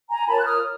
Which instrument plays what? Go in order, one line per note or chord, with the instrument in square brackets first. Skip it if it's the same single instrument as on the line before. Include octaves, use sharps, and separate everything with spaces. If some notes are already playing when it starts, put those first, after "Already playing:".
[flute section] G#5 A#5
F4 A#4 C#5 A5 B5
F#6
D#6 F6